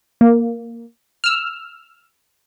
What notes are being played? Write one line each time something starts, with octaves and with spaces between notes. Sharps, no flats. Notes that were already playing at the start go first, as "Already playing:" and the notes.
A#3
E6 F6